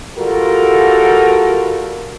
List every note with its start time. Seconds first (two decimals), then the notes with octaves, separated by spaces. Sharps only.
0.18 G3 F4 F#4 A4 A#4